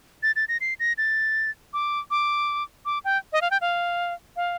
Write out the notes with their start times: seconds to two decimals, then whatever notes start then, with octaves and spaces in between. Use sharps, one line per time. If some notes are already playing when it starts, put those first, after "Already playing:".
0.23 A6
0.36 A6
0.49 A#6
0.61 C7
0.80 A#6
0.98 A6
1.73 D6
2.11 D6
2.86 D6
3.05 G5
3.33 D#5
3.41 F5
3.51 G5
3.61 F5
4.36 F5